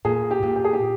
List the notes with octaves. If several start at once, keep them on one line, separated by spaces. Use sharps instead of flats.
A#2 G#4
G4
A#2
G4
G#4
G4